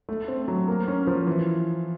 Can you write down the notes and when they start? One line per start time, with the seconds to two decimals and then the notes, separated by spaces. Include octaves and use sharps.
0.09 A3
0.28 C4
0.48 F#3
0.68 A#3
0.88 C#4
1.07 F3
1.27 E3